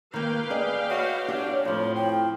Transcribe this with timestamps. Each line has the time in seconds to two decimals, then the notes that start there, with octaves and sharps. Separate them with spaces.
0.14 D#3 A#3 B4 F5 G5
0.50 G#4 D5 D#5
0.90 F#4 C#5
1.28 D4 G4 E5
1.65 F2 A2 F3
1.96 G5